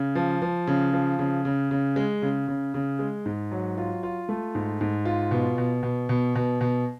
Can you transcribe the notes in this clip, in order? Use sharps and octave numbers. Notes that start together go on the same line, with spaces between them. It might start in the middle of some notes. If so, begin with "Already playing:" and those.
Already playing: C#3
F3
F3
C#3
F3
C#3
C#3
C#3
G#3
C#3
C#3
C#3
G#3
G#2
F#3
F4
F4
A3
G#2
G#2
F4
B2
B2
B2
B2
B2
B2